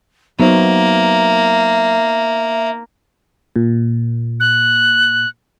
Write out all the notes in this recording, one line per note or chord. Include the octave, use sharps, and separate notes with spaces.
F#3 A#3 B3 D#4 C5 E5
A#2
F#6